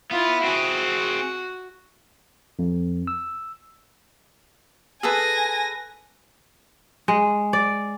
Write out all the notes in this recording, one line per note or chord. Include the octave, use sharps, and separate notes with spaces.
B3 E4 F4
C4 F#4 G#4
F2
E6
G#4 A4 B4 G#5 A#6
G#3
D5